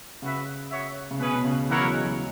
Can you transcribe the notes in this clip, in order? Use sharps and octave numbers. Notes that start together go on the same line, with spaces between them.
C#3 F#4 B4 E5
B3 F#4 C#5 E5
C#3
B2 C#4 G#4 B4
B2
C#3
E3 A#3 E4 A#4 C#5 F#5
F#3
G#3
F#3